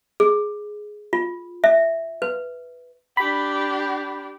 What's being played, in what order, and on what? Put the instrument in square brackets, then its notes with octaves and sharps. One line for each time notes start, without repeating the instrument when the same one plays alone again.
[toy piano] G#4
F4
E5
B4
[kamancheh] D4 G4 [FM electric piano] B5